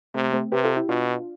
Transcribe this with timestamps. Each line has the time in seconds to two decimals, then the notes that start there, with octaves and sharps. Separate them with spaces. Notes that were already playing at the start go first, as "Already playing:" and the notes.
0.14 C3 A3 C4
0.33 A3 C4
0.52 C3 G4 B4
0.64 F4 A4
0.76 E4 G4
0.88 B2 D4 F4